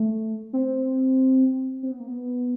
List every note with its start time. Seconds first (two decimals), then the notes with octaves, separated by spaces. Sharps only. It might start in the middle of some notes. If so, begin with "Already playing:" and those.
Already playing: A3
0.53 C4
1.83 C4
1.91 B3
2.00 A#3
2.08 B3